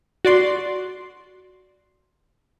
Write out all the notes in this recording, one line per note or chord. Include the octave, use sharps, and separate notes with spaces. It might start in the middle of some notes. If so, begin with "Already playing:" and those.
F#4 D5 C6